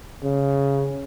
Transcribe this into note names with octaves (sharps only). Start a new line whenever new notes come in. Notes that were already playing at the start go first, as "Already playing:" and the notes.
C#3